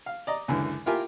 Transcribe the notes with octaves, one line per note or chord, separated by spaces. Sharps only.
F5
D5 D#5 A#5
C#2 F#2 D3 E3
E4 F4 G4 A#4 G#5